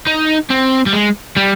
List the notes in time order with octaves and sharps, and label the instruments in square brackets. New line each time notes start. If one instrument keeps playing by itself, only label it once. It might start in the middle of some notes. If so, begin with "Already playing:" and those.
[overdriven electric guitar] D#4
C4
G3
G#3
G3